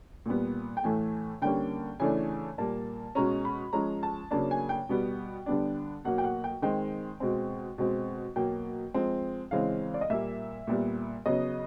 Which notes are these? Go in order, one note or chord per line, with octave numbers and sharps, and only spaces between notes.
A#2 G3 B3
G5
A2 E3 A3 G#5
D3 G3 A#3 C#4 G5
C#3 E3 A3 D4 G#5
A#2 G3 A#3 A5
B2 G#3 C#4 A#5
B5
F3 G#3 C#4 A#5
A5
C#3 F#3 A#3 D4 A5
G#5
G5
B2 G3 B3
D3 G3 B3 D4
B2 F#3 A#3 F#5
G5
F#5
G5
D#3 G#3 C4 G5
B2 G#3 C4
B2 G#3 C4
B2 F#3 A#3 G5
F3 G#3 C4
C#3 E3 G#3 C4 F5
D5
D#5
A#2 G3 A#3 E5
A#2 G3 B3
C#3 F#3 B3 D#5